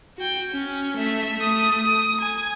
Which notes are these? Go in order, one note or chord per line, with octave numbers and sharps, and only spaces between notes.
F#4 G5
C#4
A3 E5
A3 D#6
D#6
G#5